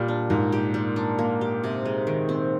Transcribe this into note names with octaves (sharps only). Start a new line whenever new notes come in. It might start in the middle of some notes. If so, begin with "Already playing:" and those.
Already playing: A#2 G3
D4
G#2 A#3
G4
G3
D4
A#3
G4
C3
G#3
D#3
C4